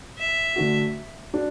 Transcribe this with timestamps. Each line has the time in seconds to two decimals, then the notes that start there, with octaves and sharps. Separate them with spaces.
0.18 E5
0.56 D3 A3 D4 F#4
1.33 D4 F#4